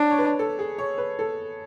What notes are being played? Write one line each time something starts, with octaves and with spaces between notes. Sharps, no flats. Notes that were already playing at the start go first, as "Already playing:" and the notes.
Already playing: D4 C#5
C#5
B4
A4
G#4
C#5
B4
A4